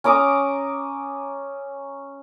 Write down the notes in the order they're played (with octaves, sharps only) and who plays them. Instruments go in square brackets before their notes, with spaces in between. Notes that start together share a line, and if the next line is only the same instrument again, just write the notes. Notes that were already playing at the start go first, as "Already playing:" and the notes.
[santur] C#4 A#5 D6 D#6